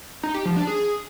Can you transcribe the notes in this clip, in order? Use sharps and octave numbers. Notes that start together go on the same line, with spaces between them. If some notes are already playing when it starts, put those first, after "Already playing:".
D#4
G4
F3
D4
G#4